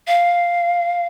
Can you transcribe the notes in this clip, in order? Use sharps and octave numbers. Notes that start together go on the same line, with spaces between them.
F5